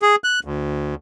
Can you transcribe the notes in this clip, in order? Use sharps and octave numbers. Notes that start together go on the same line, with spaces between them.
G#4
F#6
D2